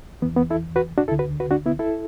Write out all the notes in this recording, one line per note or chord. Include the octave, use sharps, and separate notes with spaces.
E2 E3 B3
B3
E4 A4
F#4 B4
D4 F#4
D2 D3 E4 A4
F#4 B4
F#4 B4
D4 F#4
B3 E4
E4 A4